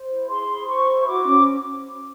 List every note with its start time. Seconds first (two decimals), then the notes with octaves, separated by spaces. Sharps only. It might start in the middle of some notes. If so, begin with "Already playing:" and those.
Already playing: C5
0.10 E4
0.29 G#4 C6
0.49 E4
0.68 C5 C#6
0.88 E4
1.07 F#4 D6
1.26 C#4